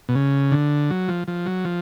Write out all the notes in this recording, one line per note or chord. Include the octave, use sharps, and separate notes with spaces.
B2
C#3
D3
F#3
F3
F3
F#3
F3